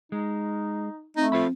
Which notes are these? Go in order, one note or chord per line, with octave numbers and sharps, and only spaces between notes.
G#3 D#4
A3 C4 D#4
F3 A4 E5 B5